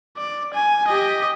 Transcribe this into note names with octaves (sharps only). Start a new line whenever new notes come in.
D5
G#5
G4 D#5